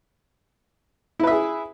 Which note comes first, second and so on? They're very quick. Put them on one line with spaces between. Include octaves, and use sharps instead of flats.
E4 B4 E5 G#4